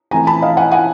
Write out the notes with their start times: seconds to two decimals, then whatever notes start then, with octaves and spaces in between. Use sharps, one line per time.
0.11 E3 A3 C4 G#5 A#5
0.27 A5 B5
0.42 D#5 F5
0.57 F#5 G#5
0.71 F#5 G#5